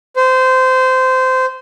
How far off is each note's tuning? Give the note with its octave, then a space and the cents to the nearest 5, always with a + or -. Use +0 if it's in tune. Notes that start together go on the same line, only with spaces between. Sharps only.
C5 -20